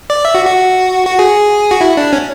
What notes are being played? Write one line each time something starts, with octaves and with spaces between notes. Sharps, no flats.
D5
E5
F#4
F#4
F#4
G#4
F#4
E4
D4
C#4